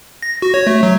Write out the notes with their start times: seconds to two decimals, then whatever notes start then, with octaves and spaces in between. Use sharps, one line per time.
0.22 A#6
0.42 F#4
0.54 C#5
0.67 A3
0.83 F#3